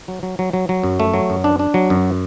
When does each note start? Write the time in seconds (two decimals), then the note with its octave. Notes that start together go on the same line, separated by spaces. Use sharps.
0.08 F#3
0.23 F#3
0.39 F#3
0.53 F#3
0.69 F#3
0.83 F#2
1.00 A3
1.14 F#3
1.30 F#2
1.44 D4
1.59 D4
1.74 F#3
1.90 F#2